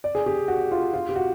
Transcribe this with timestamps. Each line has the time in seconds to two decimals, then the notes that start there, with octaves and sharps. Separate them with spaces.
0.04 D5
0.15 G#4
0.26 G4
0.48 F#4
0.71 F4
0.94 F4
1.09 G4
1.16 F#4